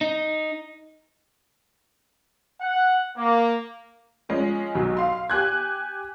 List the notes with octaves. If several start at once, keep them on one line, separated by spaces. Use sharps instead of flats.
D#4
F#5
A#3
F3 G#3 C#4
B1 F#3
F5 C6
G4 G#5 F#6 G#6